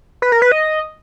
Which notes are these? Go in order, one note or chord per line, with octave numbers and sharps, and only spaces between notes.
B4
A#4
B4
D#5